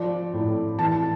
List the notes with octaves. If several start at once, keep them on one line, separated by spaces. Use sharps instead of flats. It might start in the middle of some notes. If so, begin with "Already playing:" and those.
Already playing: F3 D5
A2
E3 A5